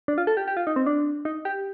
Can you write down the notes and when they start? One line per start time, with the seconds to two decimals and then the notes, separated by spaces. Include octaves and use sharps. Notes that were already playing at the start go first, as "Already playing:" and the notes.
0.08 D4
0.18 F4
0.27 A4
0.37 G4
0.48 G4
0.57 F4
0.67 D#4
0.76 C4
0.86 D4
1.25 D#4
1.45 G4